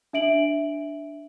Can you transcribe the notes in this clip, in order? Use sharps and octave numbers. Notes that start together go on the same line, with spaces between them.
D4 E5 D7 F#7